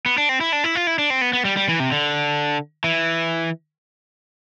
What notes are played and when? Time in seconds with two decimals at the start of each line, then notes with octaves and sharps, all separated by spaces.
0.06 B3
0.18 D4
0.29 C4
0.41 E4
0.52 D4
0.64 E4
0.75 F4
0.87 E4
0.99 D4
1.10 C4
1.21 B3
1.33 B3
1.45 G3
1.57 G3
1.69 E3
1.80 C3
1.92 D3
2.84 E3